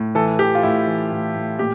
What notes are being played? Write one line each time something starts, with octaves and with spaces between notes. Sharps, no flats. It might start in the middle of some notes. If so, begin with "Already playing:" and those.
Already playing: A2
E3 A4
E3 G4
F4
A2 E4
E3
A2
A2
A#2 G4